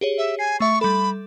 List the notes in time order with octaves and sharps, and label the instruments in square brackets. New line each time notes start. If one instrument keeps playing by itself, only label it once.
[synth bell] G4 G#4 C#5
[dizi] E5
[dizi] G#5 [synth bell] C7
[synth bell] A3 E5 [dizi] C#6
[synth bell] G3 A4 [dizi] B5